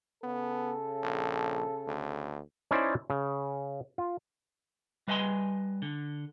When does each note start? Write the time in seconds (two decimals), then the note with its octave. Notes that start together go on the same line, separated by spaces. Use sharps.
0.23 C#3 B3 A4
1.03 A#1
1.87 D2
2.71 C#4 D#4 E4 C5 D5
3.10 C#3
3.98 F4
5.08 G3 B4 D#5 F5 G#5 C6
5.82 D3